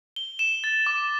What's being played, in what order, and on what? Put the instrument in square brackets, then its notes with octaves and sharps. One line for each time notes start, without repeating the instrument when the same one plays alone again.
[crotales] G7
E7
A6
D6